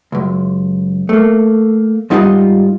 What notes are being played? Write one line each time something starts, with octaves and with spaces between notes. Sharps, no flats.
C#2 F#2
A3 A#3
G#2 G3 D#4 F4 C#5 F#5